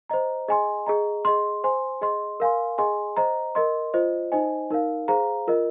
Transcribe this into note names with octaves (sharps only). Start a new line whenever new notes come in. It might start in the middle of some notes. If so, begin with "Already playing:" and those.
C5 D#5 A#5
G#4 D#5 G#5 C6
G#4 D#5 A#5
G#4 D#5 C6
C5 G#5 C6
G#4 D#5 C6
A#4 F5 G#5 C6
G#4 D#5 G#5 C6
C5 D#5 A#5
A#4 D#5 C6
F4 C5 D#5
D#4 C5 D#5 G#5
D#4 A#4 F5
G#4 C5 F5 A#5
F4 A#4 D#5